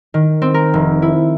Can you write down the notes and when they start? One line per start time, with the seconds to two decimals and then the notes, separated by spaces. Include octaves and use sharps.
0.14 D#3
0.42 C4
0.54 A#4
0.74 F1
1.02 E4